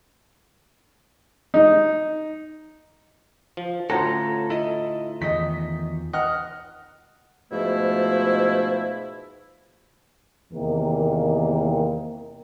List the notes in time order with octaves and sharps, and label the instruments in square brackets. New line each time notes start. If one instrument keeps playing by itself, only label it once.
[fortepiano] D#4
[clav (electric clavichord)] F3
[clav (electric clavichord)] D2 A2 [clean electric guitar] C#4 A4 [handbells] F4 A#5 A#6 [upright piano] F#5
[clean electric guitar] E4 A4 D#5
[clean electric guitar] E2 D#3 [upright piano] D#5 B6
[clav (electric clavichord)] D#5 [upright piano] F#5 F6
[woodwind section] G#2 B2 F3 A3 E4
[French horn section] E2 C3 D#3 A#3